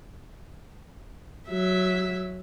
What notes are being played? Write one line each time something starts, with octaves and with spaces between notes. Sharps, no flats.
F#3 E5